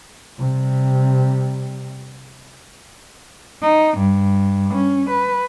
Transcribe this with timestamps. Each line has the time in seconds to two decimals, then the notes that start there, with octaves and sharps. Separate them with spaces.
0.39 C3 G3
3.62 D#4
3.98 G2
4.74 C#4
5.10 B4